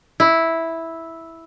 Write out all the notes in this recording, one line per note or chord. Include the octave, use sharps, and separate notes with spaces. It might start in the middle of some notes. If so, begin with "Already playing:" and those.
E4